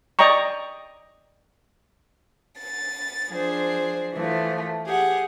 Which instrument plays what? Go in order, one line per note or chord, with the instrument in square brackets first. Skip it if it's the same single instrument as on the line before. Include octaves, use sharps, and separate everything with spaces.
[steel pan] D5 D#5 G5 A#5 C#6
[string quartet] A6
F3 D4 G#4 C5
E3 F3 A3
G4 G#4 F#5